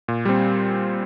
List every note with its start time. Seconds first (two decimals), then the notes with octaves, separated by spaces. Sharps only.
0.08 A#2
0.25 G3 C4